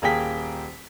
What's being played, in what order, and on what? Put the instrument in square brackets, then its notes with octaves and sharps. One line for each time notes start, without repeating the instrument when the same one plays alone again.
[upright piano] D#1 A#3 G#4 G5 B6